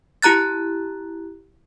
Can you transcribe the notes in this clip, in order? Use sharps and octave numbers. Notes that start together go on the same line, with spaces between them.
E4 G4 A#5 F#6 A6